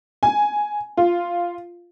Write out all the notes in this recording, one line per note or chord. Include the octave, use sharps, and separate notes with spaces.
G#5
F4